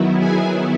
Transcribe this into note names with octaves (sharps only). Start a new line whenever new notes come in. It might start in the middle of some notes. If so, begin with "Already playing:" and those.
Already playing: D#3 F#3 B3 E4
G#4 G#5